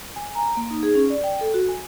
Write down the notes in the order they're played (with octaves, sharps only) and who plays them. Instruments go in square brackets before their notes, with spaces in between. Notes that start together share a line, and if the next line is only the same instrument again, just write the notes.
[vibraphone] G#5
A#5
A#3
D#4
G#4
C#4
D5
G5
A4
F#4
G#5